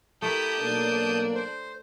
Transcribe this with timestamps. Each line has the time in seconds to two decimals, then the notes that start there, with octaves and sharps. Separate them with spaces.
0.22 A3 E4 G4 A#4 A5 D#6 G6
0.60 B1 A#3 D4
1.35 C5